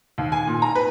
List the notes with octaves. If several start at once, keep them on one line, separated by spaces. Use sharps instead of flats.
D#2
G#5
A#2
A#5
B4